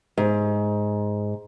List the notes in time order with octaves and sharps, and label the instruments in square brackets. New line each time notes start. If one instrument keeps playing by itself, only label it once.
[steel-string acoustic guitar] G#2